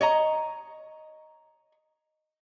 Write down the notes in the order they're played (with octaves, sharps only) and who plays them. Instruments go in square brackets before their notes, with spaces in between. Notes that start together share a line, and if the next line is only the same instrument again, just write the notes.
[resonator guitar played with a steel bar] C#5 D#5 A#5